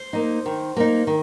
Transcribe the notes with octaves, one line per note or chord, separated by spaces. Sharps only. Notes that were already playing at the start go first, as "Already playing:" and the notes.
Already playing: C5
A#3 D#4
D#3
A#3 D#4
D#3